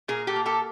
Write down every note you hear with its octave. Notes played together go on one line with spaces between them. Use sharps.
A#2 G#4 A#4
G4 A4
A#3
G4 A4